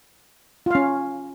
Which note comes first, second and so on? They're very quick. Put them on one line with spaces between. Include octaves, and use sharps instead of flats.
F4 F5 C#4